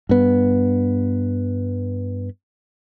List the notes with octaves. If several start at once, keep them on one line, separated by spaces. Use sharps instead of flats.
G2 B3